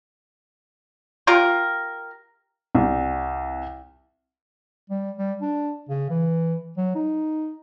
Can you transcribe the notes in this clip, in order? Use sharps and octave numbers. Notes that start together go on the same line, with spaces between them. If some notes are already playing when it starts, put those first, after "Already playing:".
F4 G4 A#4
C2
G3
G3
D4
C#3
E3
F#3
D#4